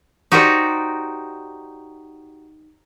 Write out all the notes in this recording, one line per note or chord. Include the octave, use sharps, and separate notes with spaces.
D#4 F#4 G4 A#4 C5 D5